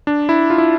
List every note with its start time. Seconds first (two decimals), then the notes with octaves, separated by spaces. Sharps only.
0.07 D4
0.29 E4
0.50 F4
0.58 E4